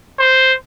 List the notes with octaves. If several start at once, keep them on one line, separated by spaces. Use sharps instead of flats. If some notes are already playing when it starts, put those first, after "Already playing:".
C5